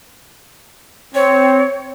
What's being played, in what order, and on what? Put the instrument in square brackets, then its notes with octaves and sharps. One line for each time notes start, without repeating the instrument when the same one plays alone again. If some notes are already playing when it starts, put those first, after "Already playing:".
[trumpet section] C4 [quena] C#5